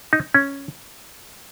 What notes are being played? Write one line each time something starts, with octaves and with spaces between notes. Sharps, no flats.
D#4
C#4